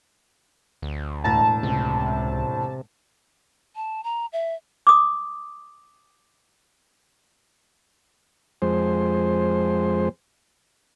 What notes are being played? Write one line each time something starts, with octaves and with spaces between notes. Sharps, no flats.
D2
E1 A2 A5 A#5
C#2 C3
A5
A#5
E5
D6 D#6
F2 G#3 C5